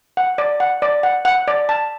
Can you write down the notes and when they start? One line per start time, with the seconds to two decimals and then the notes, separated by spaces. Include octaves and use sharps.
0.17 F#5
0.38 D5
0.60 F#5
0.82 D5
1.03 F#5
1.25 F#5
1.48 D5
1.69 A5